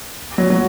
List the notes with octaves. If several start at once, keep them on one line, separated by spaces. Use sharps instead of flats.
F#3
F#3